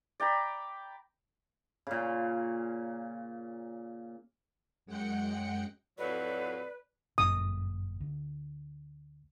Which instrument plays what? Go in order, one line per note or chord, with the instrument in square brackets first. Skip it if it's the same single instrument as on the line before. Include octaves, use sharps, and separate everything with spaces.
[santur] D5 G5 A#5 B5
[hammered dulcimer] A#2 C#3
[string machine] F#2 G#3 F#5 G5 C#7
[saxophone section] F2 A2 F#3 [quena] B4 [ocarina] D5
[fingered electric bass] G1 F#2 A#2 [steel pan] D#6
[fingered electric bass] D2